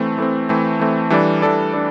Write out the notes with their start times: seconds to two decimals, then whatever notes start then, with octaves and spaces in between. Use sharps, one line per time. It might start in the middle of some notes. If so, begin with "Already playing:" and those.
Already playing: E3 A3 C4
0.18 E3 A3 C4
0.49 E3 A3 C4
0.79 E3 A3 C4
1.10 E3 G3 D4 A4 D5
1.42 E3 G3 D4 A4 D5
1.73 D4 A4 D5